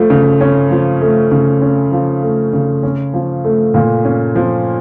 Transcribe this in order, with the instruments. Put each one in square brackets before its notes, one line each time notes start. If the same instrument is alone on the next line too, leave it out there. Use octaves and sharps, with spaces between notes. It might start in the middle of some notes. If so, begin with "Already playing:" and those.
Already playing: [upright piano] F3 A3
C#3
C#4
F3
A3
C#3
C#4
F3
A3
C#3
C#4
F3
A3
A#2
C#4
F3